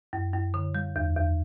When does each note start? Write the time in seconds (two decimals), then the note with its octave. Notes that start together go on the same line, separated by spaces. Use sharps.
0.13 F#2
0.34 F#2
0.54 D3
0.75 G3
0.96 E2
1.16 E2